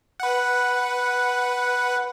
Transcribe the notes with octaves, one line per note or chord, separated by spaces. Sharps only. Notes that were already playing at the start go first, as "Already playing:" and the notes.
B4 F#5